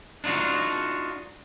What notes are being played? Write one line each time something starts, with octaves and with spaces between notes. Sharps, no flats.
D4 D#4 F4 F#4